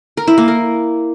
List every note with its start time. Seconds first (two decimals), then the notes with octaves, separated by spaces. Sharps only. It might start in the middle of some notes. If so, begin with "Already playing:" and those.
0.17 A#4
0.27 E4
0.38 A#3
0.48 A#4